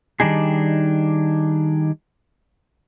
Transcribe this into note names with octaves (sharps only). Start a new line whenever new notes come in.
D#3 G3 D4 D#4 G#4